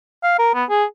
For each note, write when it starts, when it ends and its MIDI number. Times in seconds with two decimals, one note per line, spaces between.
0.24 0.37 77
0.39 0.50 70
0.54 0.64 59
0.70 0.84 68